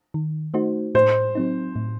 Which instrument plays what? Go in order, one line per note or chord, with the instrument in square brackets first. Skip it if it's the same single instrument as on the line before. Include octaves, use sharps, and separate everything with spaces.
[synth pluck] D#3
A3 D#4 F#4 C5
[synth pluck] A2 [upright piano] C5
[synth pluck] F#3 C4 D#4
A2